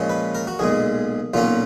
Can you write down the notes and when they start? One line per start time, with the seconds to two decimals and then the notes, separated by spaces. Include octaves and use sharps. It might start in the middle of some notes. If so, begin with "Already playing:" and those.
Already playing: A#2 F3 G#3 C#4
0.09 B4
0.35 A#4
0.47 F#4
0.59 B1 A#2 G#3 G#4
1.34 B1 A#2 F#3 A#3 C#4 F4